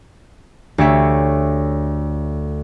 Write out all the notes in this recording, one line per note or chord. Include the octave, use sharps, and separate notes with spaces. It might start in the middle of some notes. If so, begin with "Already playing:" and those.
D2 G4 C#5 E5